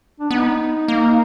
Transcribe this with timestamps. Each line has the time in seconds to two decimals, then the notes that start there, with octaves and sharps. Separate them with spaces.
0.20 D4
0.31 B3 D#4
0.88 A#3